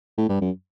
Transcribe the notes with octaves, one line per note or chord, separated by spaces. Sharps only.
A2
G2
F#2